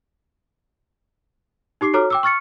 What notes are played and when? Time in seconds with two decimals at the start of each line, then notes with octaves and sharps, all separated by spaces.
1.81 D#4 G4 D6 C7
1.94 F#4 A4 C#5 A#5 D6 F6
2.10 G5 D6 E6
2.23 C#6 F6 A6 C#7